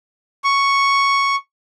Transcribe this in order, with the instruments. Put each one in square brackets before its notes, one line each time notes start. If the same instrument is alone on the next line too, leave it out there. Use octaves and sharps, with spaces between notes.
[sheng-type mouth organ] C#6